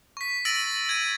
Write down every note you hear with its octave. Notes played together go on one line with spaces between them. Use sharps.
C#6 B6
E6 A6 A#6 D7 D#7 F#7
A6
G#6 D#7